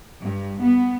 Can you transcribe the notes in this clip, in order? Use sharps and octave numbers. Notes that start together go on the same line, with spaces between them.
G2
B3